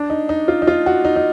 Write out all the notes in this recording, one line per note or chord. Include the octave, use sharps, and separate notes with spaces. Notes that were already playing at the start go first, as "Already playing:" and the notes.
Already playing: D4
D#4
D#4
F4
D#4
F4
F#4
D#4
D#4